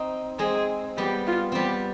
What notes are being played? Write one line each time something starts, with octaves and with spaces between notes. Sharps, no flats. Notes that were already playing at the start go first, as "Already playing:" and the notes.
Already playing: C4 D#4
G#3 C4 G#4
G3 B3 G4
F4
G3 B3 C4 G4